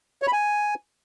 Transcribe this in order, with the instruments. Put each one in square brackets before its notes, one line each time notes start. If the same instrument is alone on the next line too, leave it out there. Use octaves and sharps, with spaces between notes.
[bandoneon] C#5
B5
G#5